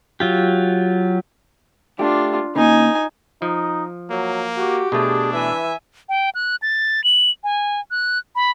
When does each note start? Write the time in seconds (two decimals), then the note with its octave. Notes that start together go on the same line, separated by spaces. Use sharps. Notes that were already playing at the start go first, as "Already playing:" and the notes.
0.20 F#3 F4 G4
1.99 A3 D4 F4 G4
2.56 C#3 A#3 D#4 G#5
3.42 F3 D#4
4.10 F#3 A#3
4.57 F#4 G4
4.92 B2 A3 D4 G#4
5.33 E3 E5 G#5
6.09 G5
6.35 F#6
6.62 A6
7.04 F#7
7.44 G#5
7.91 F#6
8.35 B5